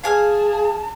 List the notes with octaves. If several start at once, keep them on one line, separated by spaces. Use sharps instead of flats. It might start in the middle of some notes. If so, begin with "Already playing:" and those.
G#4 F5 G#5 A5 F6